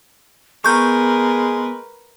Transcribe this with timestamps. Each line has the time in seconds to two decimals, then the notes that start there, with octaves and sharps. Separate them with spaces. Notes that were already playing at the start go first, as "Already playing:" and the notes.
0.64 G#3 B3 A#4 B4 C#6 G6